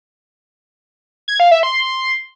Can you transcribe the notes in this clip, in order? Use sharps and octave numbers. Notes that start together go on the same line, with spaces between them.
G#6
F5
E5
C6